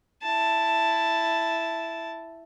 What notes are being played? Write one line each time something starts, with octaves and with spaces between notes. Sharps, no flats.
E4 A5